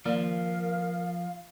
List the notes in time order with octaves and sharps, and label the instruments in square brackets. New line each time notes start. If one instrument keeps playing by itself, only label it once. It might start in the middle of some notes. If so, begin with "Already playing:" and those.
[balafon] D#3 A#3 D5 [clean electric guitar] F3 [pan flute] A#4 [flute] F5